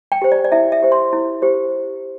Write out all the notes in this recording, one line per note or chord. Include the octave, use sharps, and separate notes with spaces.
G5
G4 C5
D5
D5
E4 E5
E5
G4 C5
C6
E4
G4 C5